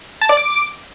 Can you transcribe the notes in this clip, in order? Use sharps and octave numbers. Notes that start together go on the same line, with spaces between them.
A5
D5
D6